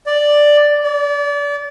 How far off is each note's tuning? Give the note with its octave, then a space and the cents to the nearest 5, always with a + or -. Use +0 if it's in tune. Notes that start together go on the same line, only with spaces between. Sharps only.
D5 +5
D5 -30